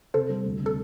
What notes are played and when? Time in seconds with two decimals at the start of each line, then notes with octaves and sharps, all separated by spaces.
0.14 C3 A4 C5
0.29 G3
0.46 D2
0.60 C3
0.66 A4